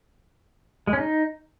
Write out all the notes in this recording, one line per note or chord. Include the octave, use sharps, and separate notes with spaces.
G#3
C#4
D#4